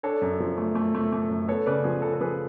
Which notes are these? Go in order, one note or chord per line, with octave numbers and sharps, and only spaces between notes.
D4 A4 C#5
F#2
F3
A3
A3
A3
A3
F#2
B3 A4 C#5
C#3 B4 D5
F3 G#4
C#3 A4
A4
F3 G#4 B4